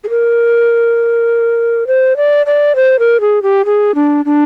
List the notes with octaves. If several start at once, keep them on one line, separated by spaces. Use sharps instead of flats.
G#4
A#4
C5
D5
D5
C5
A#4
G#4
G4
G#4
D4
D4